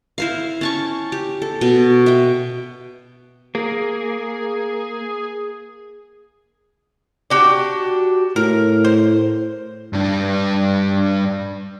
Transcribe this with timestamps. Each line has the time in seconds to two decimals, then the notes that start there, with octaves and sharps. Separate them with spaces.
0.18 E4 C5 F5
0.61 C#4 A5 C#6
1.12 G4
1.42 A4
1.61 B2
2.06 E5 G5
3.55 A#3 G#4
7.30 D4 F#4 G4
8.36 A2 A#4
8.84 C5
9.93 G2 D4